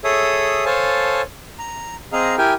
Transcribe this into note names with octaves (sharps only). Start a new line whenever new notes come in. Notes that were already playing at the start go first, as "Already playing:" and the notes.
G#4 A4 C#5 E5 D#6
A4 C5 C#5 F5 G#5 A5
A#5
C4 G#4 D#5 F5 A#5
E4 G4 A#4 G5 G#5